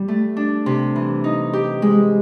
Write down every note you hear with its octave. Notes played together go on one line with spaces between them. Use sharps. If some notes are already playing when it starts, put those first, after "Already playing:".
Already playing: G3
A3
D4
C3
E3
D#4
G4
G#3